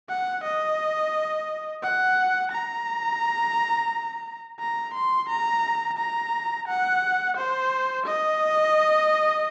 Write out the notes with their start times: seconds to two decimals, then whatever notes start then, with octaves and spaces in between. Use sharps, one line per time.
0.09 F#5
0.44 D#5
1.82 F#5
2.51 A#5
4.60 A#5
4.94 C6
5.29 A#5
5.98 A#5
6.68 F#5
7.37 C5
8.06 D#5